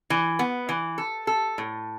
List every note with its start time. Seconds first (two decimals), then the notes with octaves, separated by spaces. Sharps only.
0.10 E3
0.39 B3
0.69 E3
0.98 A4
1.27 A4
1.58 A2